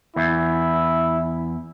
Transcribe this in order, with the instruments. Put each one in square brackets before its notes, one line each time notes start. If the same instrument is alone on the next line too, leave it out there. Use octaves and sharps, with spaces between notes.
[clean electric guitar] E2 [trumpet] E4